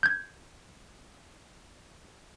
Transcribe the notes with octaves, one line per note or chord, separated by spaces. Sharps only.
G6 G#6